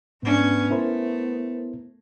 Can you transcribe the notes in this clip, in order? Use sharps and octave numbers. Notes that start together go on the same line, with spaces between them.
G#2 A3 B3 C#4 D4
A3 E4 A#4 C5